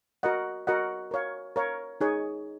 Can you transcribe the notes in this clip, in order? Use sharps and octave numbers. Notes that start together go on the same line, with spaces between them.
F#4 A#4 D#5 F#5
F#4 A#4 D#5 F#5
A#4 C#5 F5
A#4 C#5 F5
D#4 G#4 C#5